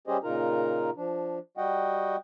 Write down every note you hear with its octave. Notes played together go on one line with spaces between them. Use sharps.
G3 C#4 G4 G#4 C5 D#5
A#2 C#3 D#4 F4 A#4 A#5
F3 D4
G3 F#4 D#5 F#5 G5